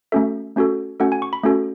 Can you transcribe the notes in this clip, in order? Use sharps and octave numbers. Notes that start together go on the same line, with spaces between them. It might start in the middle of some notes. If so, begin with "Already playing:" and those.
A3 C#4 F#4 A4 E5
A3 C#4 F#4 A4
A3 C#4 F#4 A4 F#5
G#5
C#6
B5
A3 C#4 F#4 A4